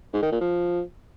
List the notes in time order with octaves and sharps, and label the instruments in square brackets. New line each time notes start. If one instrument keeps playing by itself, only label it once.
[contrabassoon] G#2
D#3
A#2
F3